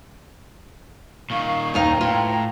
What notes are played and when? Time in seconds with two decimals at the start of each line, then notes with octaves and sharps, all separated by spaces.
1.30 A#2 D#3 F5 C#6
1.74 D#2 D#4 B4 F5 G5 A#5
2.01 A2 F4